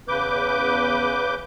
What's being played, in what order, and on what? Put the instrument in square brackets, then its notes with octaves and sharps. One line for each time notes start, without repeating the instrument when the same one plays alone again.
[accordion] E2 C#3 B4 D6 G6